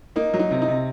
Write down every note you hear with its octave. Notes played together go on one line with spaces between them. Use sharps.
A#3 D#4
F#3
D#4
C3
D#4
C3